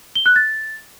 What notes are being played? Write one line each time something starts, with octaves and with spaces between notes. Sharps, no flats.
G7
F#6
A6